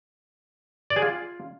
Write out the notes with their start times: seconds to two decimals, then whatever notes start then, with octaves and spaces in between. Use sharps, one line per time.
0.90 D5
0.96 G#4
1.02 F4